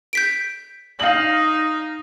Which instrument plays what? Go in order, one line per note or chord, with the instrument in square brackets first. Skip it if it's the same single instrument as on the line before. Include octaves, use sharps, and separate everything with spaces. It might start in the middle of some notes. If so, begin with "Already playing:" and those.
[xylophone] G6 B6 D7
[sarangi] D#4 [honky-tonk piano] F5 F#7